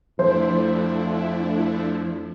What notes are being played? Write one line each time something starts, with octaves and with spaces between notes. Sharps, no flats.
F2 F3 A3 D4 E4 C5